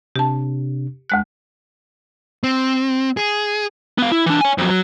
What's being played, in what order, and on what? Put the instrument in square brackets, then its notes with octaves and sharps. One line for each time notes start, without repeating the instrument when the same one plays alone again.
[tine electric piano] C3 D4 [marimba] G4 A5
[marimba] D2 G#3 F#6
[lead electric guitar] C4
G#4
B3 F5
E4
E3 D4
C#5 G#5
F2 F#3
F#3